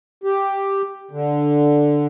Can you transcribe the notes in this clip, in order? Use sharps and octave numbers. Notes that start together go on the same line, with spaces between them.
G4
D3